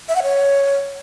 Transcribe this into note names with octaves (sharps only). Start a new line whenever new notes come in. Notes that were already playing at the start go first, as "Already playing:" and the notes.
E5
F#5
C#5